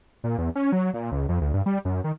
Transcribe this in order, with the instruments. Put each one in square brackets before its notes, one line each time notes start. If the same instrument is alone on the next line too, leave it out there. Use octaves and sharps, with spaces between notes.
[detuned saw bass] A#2
E2
C#4
F#3
A#2
C#2
F2
D2
G2
G3
F#2
D#3